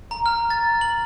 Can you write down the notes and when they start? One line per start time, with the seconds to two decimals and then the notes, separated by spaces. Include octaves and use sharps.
0.11 A#5
0.26 F6
0.50 A6
0.81 F#7